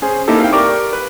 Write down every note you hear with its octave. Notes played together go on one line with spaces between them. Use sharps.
C#4 G#4 C5
A#3 C4 D#4 E4 G4 A4
F5 G5
G4 A#4 D5 C#6 D6
B4